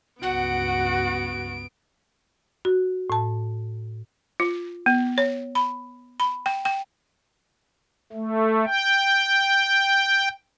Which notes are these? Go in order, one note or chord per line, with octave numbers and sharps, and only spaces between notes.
C#2 G2 B3 F#4 F#5 D7
F#4
A2 A5
F4
B3
C#5
B5
B5
G5
G5
A3
G5